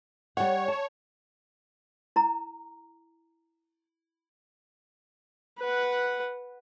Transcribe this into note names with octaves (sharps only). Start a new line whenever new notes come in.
G3 C#5 F#5
A5
E4 A#5
B4 F#5